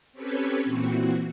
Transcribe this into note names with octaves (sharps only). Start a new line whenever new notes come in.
C4 C#4 G4 A4 B4 C#5
A#2 E3 C4 F#4